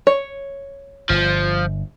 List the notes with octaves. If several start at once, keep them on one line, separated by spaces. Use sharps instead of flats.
C#5
G1 F3